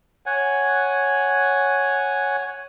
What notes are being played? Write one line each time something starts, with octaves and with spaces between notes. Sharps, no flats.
C#5 F#5 G#5